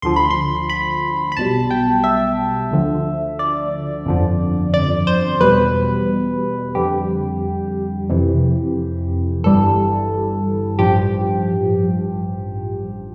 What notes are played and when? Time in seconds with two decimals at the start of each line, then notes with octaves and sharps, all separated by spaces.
0.02 D2 D3 F3 C6
0.16 B5
0.31 C6
0.69 B5
1.32 B5
1.37 B1 B2 G3 A5
1.70 G5
2.04 E5
2.71 D2 D3 F3
3.39 D5
4.06 G1 F2 D3 F3
4.74 D5
5.07 C5
5.41 E2 B2 G3 B4
6.75 F2 D3 G3 G4
8.10 F2 C3 E3
9.44 G1 G2 E3 G3 A4
10.79 A1 G2 F3 G4